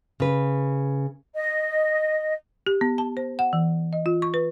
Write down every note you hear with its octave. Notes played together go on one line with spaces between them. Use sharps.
C#3 B4
D#5
G4
B3
A5
C5
F#5
E3
D#5
F4
C#6
B4